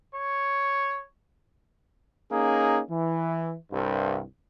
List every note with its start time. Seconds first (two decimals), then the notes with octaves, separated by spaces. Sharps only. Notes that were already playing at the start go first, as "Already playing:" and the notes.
0.15 C#5
2.31 A#3 C#4 D#4 G#4
2.90 E3
3.73 C2 G2